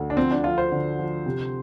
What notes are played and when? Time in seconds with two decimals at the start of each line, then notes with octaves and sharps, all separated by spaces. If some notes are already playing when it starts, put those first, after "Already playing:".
Already playing: D2
0.10 D4
0.17 F3 C4
0.31 D4
0.44 F3 F4
0.58 C5
0.72 D3
0.99 F3
1.26 C3